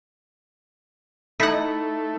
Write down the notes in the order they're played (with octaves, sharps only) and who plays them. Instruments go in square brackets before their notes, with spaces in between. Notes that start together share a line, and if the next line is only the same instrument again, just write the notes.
[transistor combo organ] A3 [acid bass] D#4 [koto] E4 F#5